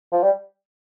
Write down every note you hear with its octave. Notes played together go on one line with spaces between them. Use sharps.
F3
G3